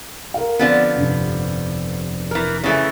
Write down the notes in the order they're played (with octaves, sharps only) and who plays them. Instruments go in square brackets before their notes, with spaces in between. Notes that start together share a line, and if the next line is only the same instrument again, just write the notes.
[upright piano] A#4 F5
[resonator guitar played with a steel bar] D3 F3 B3 [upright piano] C4
[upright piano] F1 G2
[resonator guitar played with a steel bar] E3 A#4
C#3 E3 A3